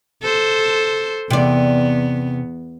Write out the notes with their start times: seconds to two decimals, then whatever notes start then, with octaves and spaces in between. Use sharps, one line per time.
0.22 A4 C5
1.30 E2 C3 B3 D5